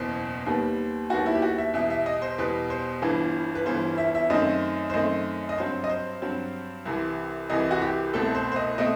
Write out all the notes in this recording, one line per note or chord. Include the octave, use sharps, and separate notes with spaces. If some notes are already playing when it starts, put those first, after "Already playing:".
Already playing: F#1 E2 B2 C5
D#2 D#3 G3 B3
D#2 D#3 G3 B3 F#4
E4
G4
F#4
E5
E2 B2 G3 E5
E5
D#5
C5
E2 B2 G3 B4
C5
G1 G2 E3 B3
B4
G1 G2 E3 B3 C5
E5
E5
F#2 D#3 A3 C4 D#5
C5
F#2 D#3 A3 C4 D#5
D#5
G2 F#3 C4 C5
D#5
C5
G2 F#3 C4
C2 C3 E3
C2 C3 E3 D#5
F#4
G4
C2 B2 A3 C4 A4
C5
C5
D#5
B2 A3 C4 D#5